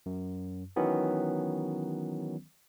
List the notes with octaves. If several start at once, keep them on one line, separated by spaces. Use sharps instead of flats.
F#2
D#3 E3 F#3 B3 C#4